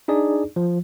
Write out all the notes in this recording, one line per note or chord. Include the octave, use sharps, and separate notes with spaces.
D4 D#4 G#4 D5
F3